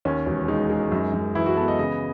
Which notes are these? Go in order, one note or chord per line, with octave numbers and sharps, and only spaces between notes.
D#2 C#4
E1
G#3 D#4
G#3
F#2
F#2
E3 E4
F#4
B3 A4
D#5
C#3 D#5